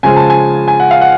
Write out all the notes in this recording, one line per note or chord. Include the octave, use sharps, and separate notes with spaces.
C#3 F3 G#3 G#5
A5
G#5
G#5
F#5
F5
F#5